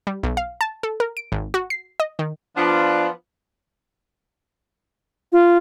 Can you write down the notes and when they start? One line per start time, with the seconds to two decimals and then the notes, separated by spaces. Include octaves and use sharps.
0.07 G3
0.23 B1
0.37 F5
0.61 A5
0.83 A4
1.00 A#4
1.17 D7
1.32 G#1
1.54 F#4
1.70 C7
2.00 D#5
2.19 D#3
2.57 F3 B3 D4 F4
5.32 F4